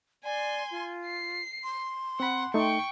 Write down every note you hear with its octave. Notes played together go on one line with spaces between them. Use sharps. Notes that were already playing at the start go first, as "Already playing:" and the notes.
D5 G#5 C6
F4
C7
C6
C4 F#5 B5
A3 D#4 G5 C#6